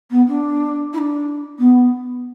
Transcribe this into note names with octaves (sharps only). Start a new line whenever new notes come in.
B3
D4
E4
D4
B3